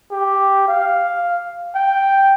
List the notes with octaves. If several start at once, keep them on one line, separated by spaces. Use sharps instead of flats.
G4
F5
G5